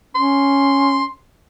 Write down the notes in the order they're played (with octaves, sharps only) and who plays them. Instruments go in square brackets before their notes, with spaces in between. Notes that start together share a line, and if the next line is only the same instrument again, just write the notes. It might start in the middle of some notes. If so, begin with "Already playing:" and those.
[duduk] C#4 [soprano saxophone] C6